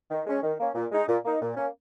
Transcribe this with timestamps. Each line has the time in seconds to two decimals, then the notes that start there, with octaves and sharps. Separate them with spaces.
0.10 D#3
0.26 G#3 C#4
0.43 D#3
0.58 A#3 C#4
0.75 A#2
0.91 G#3 D#4
1.08 A#2
1.24 A#3 D#4
1.41 A#2
1.57 A#3 C#4